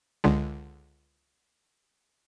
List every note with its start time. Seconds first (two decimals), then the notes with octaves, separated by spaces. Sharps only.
0.24 C#2 D3 G#3